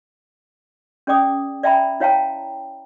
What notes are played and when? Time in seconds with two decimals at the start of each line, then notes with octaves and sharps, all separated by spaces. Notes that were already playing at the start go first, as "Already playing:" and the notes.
1.07 C#4 G#4 D5 G5 D6 D#6
1.63 D5 E5 G5 G#5 A#5 B5
2.00 E4 C#5 F5 G5 A5 A#5